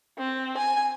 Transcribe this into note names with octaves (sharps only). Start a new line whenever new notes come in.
C4
G#5